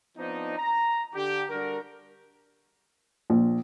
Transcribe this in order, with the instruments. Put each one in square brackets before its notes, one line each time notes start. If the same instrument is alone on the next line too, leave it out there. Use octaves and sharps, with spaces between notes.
[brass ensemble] F3 B3 C4 D4 D#4
A#5
D3 G4
D3 G3 D4 F#4 A#4
[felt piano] A#1